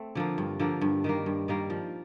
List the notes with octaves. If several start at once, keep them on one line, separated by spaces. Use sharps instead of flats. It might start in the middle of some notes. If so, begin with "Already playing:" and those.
Already playing: A3 C4
D3 F3 A#3
G2
D3 F3 A#3
G2
D#3 G3 A#3
G2
D#3 G3 A#3
F3